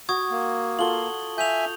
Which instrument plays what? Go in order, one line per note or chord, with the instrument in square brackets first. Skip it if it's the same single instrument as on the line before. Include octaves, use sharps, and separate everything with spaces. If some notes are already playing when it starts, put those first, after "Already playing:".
[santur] F#4 [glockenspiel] C#6 D#6 G#6
[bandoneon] A#3
[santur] F4 A4 F#5 [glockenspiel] F#7 G7
[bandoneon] E5 G#5 [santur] F5 [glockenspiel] G6 F7